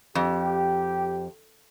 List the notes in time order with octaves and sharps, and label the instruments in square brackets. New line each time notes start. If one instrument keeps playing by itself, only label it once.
[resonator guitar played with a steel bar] F2 [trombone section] G4